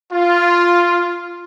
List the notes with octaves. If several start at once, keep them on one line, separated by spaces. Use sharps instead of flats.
F4